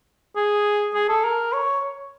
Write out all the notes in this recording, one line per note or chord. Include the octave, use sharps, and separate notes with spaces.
G#4
G#4
A4
A#4
C#5